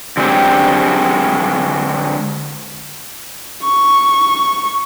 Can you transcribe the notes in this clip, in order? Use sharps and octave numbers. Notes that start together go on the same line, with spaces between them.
D3 F#3 G#3 C4 G4
C#6